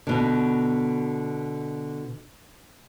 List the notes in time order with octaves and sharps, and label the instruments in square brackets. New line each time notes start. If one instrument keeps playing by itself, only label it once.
[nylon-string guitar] B2 D3